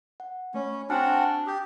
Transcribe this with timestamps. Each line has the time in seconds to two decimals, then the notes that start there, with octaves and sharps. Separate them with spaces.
0.20 F#5
0.54 A3 C#4 C#5 B5
0.90 C4 D4 F#4 F#5 G#5 A5 F6
1.47 G4 D#6 G6